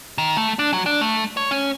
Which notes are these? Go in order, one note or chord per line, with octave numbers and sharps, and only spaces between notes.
D#3
A3
D4
F#3
D4
A3
C#5
C#4